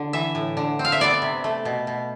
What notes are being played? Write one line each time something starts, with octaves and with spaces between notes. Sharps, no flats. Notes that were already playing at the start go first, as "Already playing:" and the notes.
Already playing: D3
E3 E5
A2
D3
C4
F5
E5
B3 D5
C3
A3
B2
B2